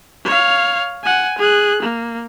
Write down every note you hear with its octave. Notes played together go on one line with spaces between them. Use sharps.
C#5 F5
F#5 G#5
G#4 F#6
A#3